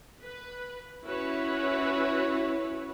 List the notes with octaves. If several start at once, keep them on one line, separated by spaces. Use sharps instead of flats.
B4
C#4 E4 F#4 B4 C#5